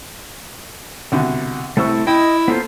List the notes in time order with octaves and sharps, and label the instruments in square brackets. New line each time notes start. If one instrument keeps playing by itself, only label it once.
[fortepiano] C2 B2 D3
[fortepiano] C2 C5 C#6 [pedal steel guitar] A3 E4 E6
[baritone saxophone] E4 [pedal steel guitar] D#5 [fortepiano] G5
[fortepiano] A#3 A4 [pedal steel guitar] B3 F4 C5